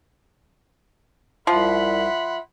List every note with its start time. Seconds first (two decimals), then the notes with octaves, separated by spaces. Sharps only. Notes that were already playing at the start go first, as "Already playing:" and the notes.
1.47 C2 F3 E5 F#5 B5 C6